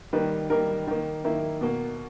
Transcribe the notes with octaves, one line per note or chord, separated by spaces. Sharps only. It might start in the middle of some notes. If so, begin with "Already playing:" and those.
D#3 G3 A#3 B4
D#3 G3 A#3 A#4
D#3 A#3
D#3 A#3 E4
B2 A#3